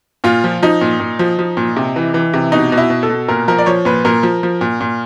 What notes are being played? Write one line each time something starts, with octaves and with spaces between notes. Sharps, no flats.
A#2 F4
F3
F3 D#4
A#2
A#2
F3
F3
A#2
C3
E3
E3
C3
B2 D#4
B2
E4
B2
A4
B2
A#2 A#4
F3 A#4
D5
F3 C#5
A#2 B4
A#2 A#4
F3
F3
A#2
A#2